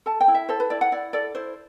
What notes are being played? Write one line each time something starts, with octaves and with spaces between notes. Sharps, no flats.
A4 A5
G5
E4
E5
A4 C5
B4
E4 D5
F#5
E4 D5
A4 D5
E4 C5